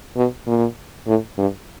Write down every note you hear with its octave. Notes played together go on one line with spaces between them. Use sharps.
B2
A#2
A2
G2